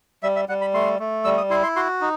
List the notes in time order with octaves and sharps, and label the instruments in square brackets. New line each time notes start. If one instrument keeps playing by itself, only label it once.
[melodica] G3 E5
E5
G3 F#5
B5
A3 C6
A3
G3 E6
D#6
E4 C6
C6
F#4 C6
D#4